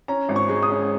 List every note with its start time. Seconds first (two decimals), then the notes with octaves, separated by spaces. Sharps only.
0.08 C#4 A#5
0.29 G#1
0.36 C#6
0.49 G#3
0.63 D#6
0.70 C#4